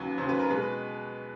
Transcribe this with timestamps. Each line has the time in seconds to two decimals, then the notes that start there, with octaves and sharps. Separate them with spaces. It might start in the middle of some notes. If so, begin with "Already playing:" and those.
Already playing: D#2 C#3 F#3 B4
0.18 D#2 C#3 F#3 C5
0.29 B4
0.39 A#4
0.50 B2 G#3 B4